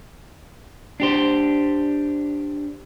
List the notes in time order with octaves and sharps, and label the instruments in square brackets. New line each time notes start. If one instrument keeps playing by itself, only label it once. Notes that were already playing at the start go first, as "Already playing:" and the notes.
[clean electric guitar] D4 G4 C5